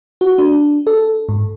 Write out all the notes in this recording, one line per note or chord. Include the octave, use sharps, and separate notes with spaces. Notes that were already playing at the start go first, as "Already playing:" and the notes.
F#4
D4
A4
G#2